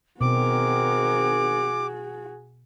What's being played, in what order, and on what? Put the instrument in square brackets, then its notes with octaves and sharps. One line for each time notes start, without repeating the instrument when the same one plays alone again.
[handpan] B2 [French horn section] D#3 C4 A#4 [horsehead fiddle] F#4 G#4 [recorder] D6